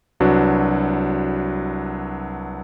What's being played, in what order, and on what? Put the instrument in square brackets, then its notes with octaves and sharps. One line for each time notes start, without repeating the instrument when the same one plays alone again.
[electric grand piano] C2 F#3 D4 F#4 B4